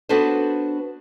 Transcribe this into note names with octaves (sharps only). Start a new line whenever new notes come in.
B3 D4 F#4 A4 B4 C5